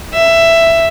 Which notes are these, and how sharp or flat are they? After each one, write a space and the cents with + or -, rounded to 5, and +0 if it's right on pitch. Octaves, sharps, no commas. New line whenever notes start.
E5 +10